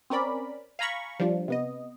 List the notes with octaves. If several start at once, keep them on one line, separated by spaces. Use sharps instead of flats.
C4 C#4 A#4 D5 B5
F5 G#5 A#5 B5 C#6
F3 G3 D4 F4
C3 B3 D#5